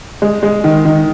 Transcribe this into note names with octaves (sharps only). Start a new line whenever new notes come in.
G#3
G#3
D#3
D#3